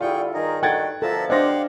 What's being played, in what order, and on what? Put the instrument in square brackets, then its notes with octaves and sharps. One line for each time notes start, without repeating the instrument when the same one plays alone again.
[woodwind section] D3 G3 E4 [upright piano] F4 [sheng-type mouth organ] G#4 G5 C#6
[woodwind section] G2 D#3 [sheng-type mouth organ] G#4 A#4
[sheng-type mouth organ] F#4 [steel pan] A4 G5 [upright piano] F#5 G#6 A6
[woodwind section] B2 D3 F3 [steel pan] A4 [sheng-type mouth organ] A#4 E5 A5
[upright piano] D4 A#6 [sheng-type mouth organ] G4 F5 F#5 [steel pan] C5 D#5